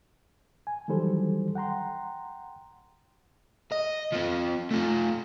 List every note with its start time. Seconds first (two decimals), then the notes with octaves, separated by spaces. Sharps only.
0.67 G#5
0.88 D#3 E3 F#3 G3 A4 C5
1.55 F#5 G5 A#5 C6
3.72 D#5
4.13 F3 C4
4.71 A3 F4